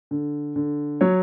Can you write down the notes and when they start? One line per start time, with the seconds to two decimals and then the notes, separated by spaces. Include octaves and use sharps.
0.11 D3
0.56 D3
1.01 F#3 C#5